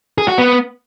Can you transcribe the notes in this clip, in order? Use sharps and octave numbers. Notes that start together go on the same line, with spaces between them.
G#4
F#4
B3